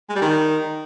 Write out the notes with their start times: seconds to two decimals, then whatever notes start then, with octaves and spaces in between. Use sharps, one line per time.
0.09 G#3
0.15 G3
0.21 D#3